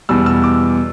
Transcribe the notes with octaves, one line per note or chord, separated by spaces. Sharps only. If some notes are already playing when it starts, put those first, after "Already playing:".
E2 B2 G3 E6
E6
D6